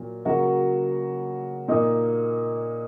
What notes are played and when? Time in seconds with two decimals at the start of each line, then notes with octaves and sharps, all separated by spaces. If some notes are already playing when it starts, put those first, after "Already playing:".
Already playing: A#2 F#3
0.25 C#3 F#3 A#3 F#4
1.68 A#2 A#3 D#4